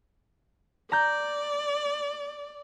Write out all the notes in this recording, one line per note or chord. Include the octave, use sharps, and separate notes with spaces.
D5 A#5 G6